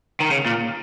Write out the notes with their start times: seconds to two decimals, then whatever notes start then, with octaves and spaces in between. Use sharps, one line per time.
0.20 D#3
0.31 C#3
0.46 A#2